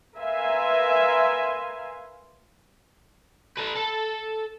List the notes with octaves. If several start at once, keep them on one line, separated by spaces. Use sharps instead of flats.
A#4 B4 E5 F5 G#5 C6
A4 B4
A4